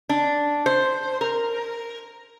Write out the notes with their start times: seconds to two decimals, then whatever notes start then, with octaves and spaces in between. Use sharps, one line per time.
0.09 D4
0.66 C5
1.21 A#4